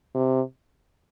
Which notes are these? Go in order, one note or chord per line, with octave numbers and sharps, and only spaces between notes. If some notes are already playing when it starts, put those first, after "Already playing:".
C3